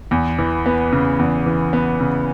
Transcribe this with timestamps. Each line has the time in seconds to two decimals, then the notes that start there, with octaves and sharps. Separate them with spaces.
0.11 E2
0.39 E3
0.66 B3
0.92 C#3
1.19 E2
1.46 E3
1.73 B3
2.00 C#3